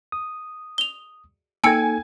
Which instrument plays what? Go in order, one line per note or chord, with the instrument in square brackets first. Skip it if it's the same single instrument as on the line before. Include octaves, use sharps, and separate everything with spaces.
[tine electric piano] D#6
[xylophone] F7 G7
[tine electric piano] A#3 D#4 A4 [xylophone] G5 E6 C#7 [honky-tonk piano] G#5 G#6